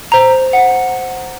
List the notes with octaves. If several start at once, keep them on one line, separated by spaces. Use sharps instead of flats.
C5 A#5
F#5